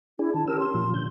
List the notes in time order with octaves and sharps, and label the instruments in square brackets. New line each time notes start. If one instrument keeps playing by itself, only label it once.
[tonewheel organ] D4 G#4 [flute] E4
[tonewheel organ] D#3 [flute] A5
[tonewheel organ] C#4 G4 E6 [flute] A#4
[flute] C6
[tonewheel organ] A#2 F3
D3 G6